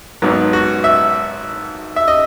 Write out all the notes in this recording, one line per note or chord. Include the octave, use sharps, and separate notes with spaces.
G#1 G#2 F#3 B3
F#4
E5
E5
D#5